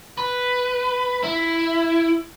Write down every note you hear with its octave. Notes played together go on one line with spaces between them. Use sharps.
B4
E4